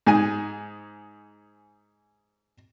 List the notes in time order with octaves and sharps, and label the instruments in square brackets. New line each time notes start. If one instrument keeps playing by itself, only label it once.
[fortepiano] G#2 G#4 G#5